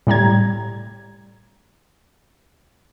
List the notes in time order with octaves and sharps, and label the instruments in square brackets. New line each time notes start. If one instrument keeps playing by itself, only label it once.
[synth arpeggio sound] A2 G3 A#5 G#6